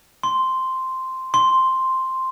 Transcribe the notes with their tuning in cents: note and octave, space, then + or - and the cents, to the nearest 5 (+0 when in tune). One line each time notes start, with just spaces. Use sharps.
C6 -5
C6 +0